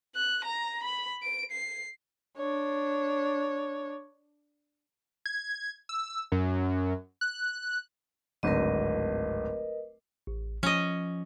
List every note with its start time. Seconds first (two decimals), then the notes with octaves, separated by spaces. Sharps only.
0.16 F#6
0.45 A#5
0.84 B5
1.23 D7
1.52 C7
2.37 D4 C#5
5.26 G#6
5.89 E6
6.32 F#2
7.21 F#6
8.43 D1 G#1 D3 A#4 B4 D#5
10.27 A1
10.63 F3 C#4 D#5